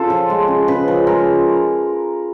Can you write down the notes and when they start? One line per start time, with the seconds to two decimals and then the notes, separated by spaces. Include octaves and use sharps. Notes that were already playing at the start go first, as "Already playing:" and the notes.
Already playing: C#3 F4 A4
0.10 F3
0.30 G#3
0.48 C#3
0.68 C#3 B4
0.88 F3
1.07 G#3 A#4